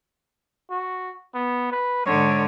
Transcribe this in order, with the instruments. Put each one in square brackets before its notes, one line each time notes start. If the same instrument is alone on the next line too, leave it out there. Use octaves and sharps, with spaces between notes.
[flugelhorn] F#4
B3
B4
[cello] G#2 D3 [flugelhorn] C#5